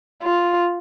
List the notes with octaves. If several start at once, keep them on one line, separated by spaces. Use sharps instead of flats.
F4